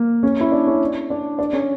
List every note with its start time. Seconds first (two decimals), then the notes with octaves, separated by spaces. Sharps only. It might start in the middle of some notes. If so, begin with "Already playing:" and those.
Already playing: A#3
0.23 C#4
0.41 E4
0.52 D4
0.67 C#4
1.10 D4
1.39 D4
1.53 C#4